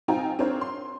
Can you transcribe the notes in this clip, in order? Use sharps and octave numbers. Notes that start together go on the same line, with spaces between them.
C4 D#4 F4 G5 G#5 A#5
C4 D4 A#4 C5 C#5
C6